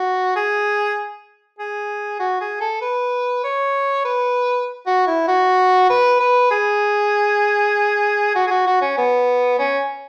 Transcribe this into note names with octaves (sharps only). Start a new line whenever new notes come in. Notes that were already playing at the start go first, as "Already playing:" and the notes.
Already playing: F#4
G#4
G#4
F#4
G#4
A4
B4
C#5
B4
F#4
E4
F#4
B4
B4
G#4
F#4
G#4
F#4
F#4
C#4
B3
C#4